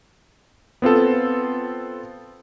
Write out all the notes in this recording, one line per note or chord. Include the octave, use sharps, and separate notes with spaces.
B3 C4 F4 A4